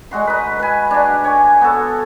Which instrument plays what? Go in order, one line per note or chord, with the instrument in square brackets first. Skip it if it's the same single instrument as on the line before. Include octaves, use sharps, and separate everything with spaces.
[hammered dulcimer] G#3 F#4 C6
D#4 B4
B4 G#5
D4 F#4
C#5 G#5 D6
B3 F#4 A4